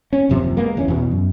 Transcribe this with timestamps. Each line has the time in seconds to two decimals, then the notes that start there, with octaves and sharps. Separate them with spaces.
0.13 C#4
0.29 F#1 D#2 C3 F3
0.57 G#3 A#3 B3
0.75 F1 E2 C#4
0.88 E2 B2
1.11 F#2